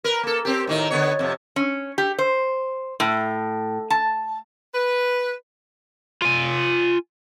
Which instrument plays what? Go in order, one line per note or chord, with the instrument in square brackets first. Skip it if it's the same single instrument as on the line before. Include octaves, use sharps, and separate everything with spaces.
[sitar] A#4 B4
A#3 A4
C4 G4
A2 D#3 D#4
D3 B3 C#5
F2 C3
[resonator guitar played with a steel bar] C#4
G4
C5
A2
A5
[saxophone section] B4
[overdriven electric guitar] F4 G#5